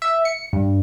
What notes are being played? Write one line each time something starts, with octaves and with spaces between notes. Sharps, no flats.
E5
C#7
G2